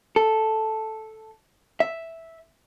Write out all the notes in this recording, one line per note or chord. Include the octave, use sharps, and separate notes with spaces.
A4
E5